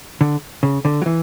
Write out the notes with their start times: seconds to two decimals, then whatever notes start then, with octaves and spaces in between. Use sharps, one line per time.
0.21 D3
0.63 C#3
0.85 D3
1.02 F#3
1.06 E3